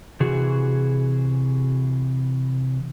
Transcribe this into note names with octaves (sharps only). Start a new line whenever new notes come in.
C3 E3 F#4 G#4